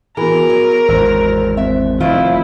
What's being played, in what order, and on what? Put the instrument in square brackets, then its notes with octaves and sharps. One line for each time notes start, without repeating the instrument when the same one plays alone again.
[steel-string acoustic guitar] E3 [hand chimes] B3 F#4 G#4 [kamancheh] A#4
[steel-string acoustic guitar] F#3
[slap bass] G#1 E2 [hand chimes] C5 E6
[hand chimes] C4 C5 [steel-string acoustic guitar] E5
[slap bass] F1 D#3 [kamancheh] E4 [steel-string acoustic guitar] F4